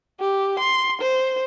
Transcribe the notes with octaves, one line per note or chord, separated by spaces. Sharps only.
G4
C6
C5